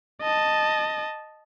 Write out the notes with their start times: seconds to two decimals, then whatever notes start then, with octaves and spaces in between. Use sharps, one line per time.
0.22 D#5 A5